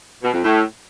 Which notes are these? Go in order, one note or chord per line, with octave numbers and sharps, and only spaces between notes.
B2
F2
A2